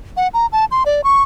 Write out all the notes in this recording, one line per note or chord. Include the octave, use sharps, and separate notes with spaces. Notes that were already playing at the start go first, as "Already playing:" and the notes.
F#5
A#5
A5
C6
D5
C#6